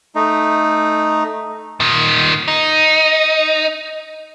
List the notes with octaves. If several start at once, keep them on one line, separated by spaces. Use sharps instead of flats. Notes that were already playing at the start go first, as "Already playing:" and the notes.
A3 D#4
A#2 D#3
D#4